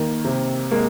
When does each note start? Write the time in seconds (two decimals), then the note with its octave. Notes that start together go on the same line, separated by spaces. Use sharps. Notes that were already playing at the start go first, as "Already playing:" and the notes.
Already playing: D#3 A#3
0.25 C3
0.71 G#3 A#3